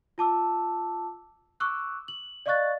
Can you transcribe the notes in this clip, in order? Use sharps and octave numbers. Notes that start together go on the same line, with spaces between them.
F4 A5 D6 E6
C#6 D6 E6 F#6
F#7
D5 D#5 F5 C#6 F#6 A6